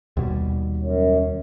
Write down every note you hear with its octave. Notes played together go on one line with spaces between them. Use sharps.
D#2 B2 G3
F#2